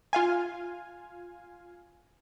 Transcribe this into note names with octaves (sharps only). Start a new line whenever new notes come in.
F4 F5 G#5